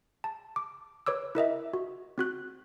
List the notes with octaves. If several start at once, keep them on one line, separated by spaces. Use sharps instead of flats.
A5
D6
B4 C#5 D6 E6
E4 A#4 D#5 E5
F#4
C4 F#4 F#6